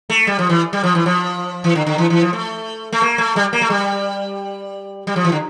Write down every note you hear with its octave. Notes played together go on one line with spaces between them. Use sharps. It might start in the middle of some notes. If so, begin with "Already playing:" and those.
A3
G3
F3
E3
G3
F3
E3
F3
E3
D3
D3
E3
E3
F3
A3
A3
A#3
A3
G3
A#3
A3
G3
G3
F3
E3
D3